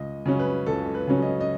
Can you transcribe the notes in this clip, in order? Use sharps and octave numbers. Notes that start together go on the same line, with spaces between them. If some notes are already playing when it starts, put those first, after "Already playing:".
Already playing: C#2 D#5
C#3 F#3 C#4
B4
C#2 A4
B4
C#3 F#3 C#4
D#5
D#5